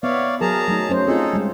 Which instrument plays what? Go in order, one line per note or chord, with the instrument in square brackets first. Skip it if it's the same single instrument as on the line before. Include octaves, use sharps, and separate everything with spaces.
[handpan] B3 E5 [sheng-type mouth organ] C#5 D5 F5
[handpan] F#3 A#4 [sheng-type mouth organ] G#4 A5 A#5
[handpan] F#3 A3 D#4
F#3 C#4 C5
[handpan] C4 F4 [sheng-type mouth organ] D#4 G#4 A4
[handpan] G3 G#3